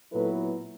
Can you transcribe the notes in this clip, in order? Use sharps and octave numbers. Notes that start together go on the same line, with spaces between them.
A#2 F#3 B3 E4 A4 B4